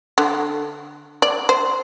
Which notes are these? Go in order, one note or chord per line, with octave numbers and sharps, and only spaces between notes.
D3
D5
C5